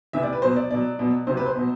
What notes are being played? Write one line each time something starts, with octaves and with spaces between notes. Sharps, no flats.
C3 E3 E5
D5
B4
B2 F#3 C5
D5
B2 F#3 D5
B2 F#3
C3 F#3 C5
B4
C5
B2 F#3